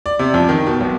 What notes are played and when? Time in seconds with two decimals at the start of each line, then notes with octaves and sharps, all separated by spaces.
0.06 D5
0.19 C3
0.34 F2
0.49 D#3
0.67 B2
0.80 B1